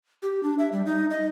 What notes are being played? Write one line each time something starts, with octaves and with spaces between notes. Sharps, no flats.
G4
D4
E5
G3
D#4
D#5